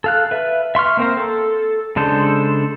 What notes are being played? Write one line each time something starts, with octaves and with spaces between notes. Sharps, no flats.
A4 F5 F#6
B4 E5
E5 C6 C#6 F6
A#3 C4 A#4 C5
A4
C#3 G#3 D4 A4 C5